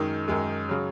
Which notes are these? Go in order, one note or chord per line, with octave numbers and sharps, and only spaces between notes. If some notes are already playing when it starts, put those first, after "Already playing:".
Already playing: F#2 D#3 G#3 D#4
F#2 D#3 G#3
C#3 F#3